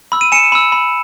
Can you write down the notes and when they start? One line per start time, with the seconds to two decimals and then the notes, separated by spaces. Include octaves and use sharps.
0.12 B5 E6
0.21 D#7
0.32 G#5 C#7 E7
0.52 B5 E6
0.72 B5